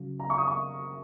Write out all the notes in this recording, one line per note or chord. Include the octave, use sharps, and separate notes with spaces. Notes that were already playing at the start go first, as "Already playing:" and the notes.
Already playing: C#3 F#3
A#5
C#6
D#6
C#6